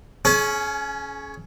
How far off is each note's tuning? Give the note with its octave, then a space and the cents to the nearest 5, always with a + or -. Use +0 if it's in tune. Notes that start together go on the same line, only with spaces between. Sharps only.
C#4 +0 G#4 +35